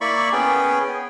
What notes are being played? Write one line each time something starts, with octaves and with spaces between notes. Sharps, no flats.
A#3 E4 D5 B5 C#6
B3 C#4 G#4 G5